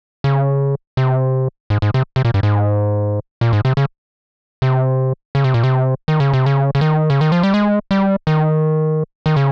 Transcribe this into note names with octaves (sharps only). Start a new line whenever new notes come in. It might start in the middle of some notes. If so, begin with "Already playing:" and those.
C#3
C3
G#2
G#2
C3
C3
A#2
G2
G#2
A#2
G#2
C3
C#3
C3
C#3
C3
A#2
C3
D#3
C#3
C3
C#3
C#3
D#3
C#3
D#3
F3
G3
G#3
G3
D#3
D#3
C#3